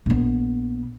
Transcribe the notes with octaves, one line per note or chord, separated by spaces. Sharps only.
A#1 B3